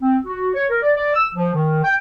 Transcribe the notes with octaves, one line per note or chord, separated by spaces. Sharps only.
C4
F#4
C#5
A#4
D5
D5
E6
F3
D#3
G5